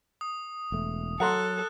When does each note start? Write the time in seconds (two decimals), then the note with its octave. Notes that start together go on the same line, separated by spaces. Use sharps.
0.21 D#6
0.72 E1 A3
1.20 F#3 A4 F#5 A#5 C6 F#6